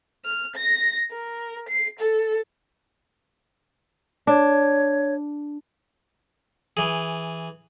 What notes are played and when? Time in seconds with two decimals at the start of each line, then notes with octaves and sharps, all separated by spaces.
0.25 F6
0.56 A#6
1.11 A#4
1.69 C7
1.99 A4
4.27 D4 C#5
6.77 E3 G#4